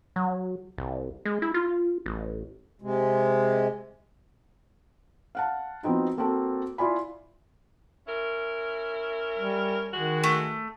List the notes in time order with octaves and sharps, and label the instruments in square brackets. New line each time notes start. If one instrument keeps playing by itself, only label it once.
[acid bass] F#3
C2
G#3
E4
F4
A1
[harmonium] C3 G#3
[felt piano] F5 F#5 A5
F3 B3 C4 D#4 F#4
A#3 C4 F#4 A4 A5
E4 F4 D5 G#5 B5
[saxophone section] C#4 E4 A#4
[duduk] G3
[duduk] D#3 [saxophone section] G#3 F#4
[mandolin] A3